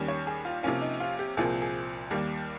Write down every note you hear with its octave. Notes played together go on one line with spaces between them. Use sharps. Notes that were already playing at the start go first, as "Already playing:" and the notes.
Already playing: D#2 D#3 G3 C#4
C#5
G#4
F4
C3 F3 A#3 C#4 F4
D#4
F4
G4
C2 A#2 F3 C4 G#4
G#4
D#2 D#3 G3 A#3